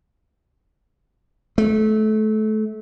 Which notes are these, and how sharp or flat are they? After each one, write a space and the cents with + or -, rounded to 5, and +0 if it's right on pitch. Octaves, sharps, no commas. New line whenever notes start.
A3 -25